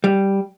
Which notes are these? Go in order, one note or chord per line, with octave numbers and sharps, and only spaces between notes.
G3